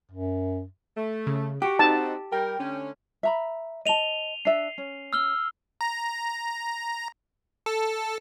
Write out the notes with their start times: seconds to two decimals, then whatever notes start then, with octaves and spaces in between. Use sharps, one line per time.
0.11 F#2
0.97 A3
1.27 C#3
1.62 F#4 G4
1.79 C4 D#4 F#4 A5
2.32 G3 A#4 G5
2.59 D3 A3 C#4
3.23 E5 A#5 B5
3.86 D#5 A5 D#7 F7 G7
4.45 D4 E5 C7
4.78 C#4
5.13 E6 F6 G7
5.81 A#5
7.66 A4